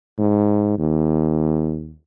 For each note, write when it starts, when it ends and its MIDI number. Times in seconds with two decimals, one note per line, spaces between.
0.18 0.73 44
0.78 1.94 39